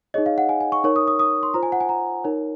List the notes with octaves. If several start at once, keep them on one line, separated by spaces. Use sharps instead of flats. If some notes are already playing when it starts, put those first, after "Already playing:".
D#4 G#4 C#5 D#5
F5
F#5
G#5
G#5
C#6
D#4 A#4 C#5 C#6
D#6
D#6
D#6
C6
F4 C5 A#5
G#5
F#5
G#5
A#5
D#4 A#4 C#5